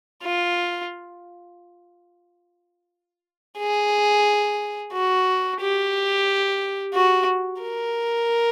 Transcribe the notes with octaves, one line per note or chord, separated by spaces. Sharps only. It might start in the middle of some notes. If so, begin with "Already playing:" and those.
F4
G#4
F#4
G4
F#4
A#4